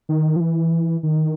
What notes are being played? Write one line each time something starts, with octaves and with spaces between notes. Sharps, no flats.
D#3
F3
E3
D#3